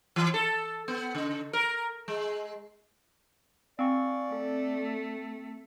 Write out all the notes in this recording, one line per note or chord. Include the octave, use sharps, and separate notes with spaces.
E3
A4
B3
C#3
A#4
G#3
C4 D5 F5 G#5 C#6
A3 A4